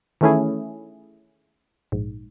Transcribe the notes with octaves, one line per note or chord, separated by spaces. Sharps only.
D#3 E3 A3 C#4 E4 G#4
A#1 G#2